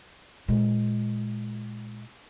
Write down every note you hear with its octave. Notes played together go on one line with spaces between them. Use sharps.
A#2 G#3